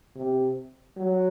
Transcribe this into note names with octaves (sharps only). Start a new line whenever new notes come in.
C3
F#3